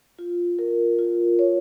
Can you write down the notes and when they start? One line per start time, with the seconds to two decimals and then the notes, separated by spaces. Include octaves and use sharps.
0.19 F4
0.59 A#4
0.99 F4
1.39 C#5